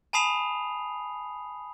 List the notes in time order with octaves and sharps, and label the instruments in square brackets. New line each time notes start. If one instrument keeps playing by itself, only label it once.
[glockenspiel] G#5 A5 B5 D#6 C7 F7